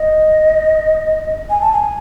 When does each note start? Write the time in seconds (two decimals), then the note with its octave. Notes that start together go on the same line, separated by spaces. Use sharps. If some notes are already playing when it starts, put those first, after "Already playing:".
Already playing: D#5
1.50 G#5
1.61 A5
1.72 G#5